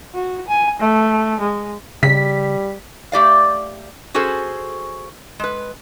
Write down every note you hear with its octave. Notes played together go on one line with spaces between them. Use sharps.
F#4
G#5
A3
G#3
C#3 G3 B6
A3 G4 D5 F5
C#4 F#4 G#4 A4 C5
G#3 B4